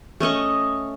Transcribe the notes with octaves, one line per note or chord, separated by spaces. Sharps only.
A3 C#4 D#5 C#6